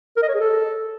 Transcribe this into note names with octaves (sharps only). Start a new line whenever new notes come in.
A#4
D#5
C#5
G#4
A4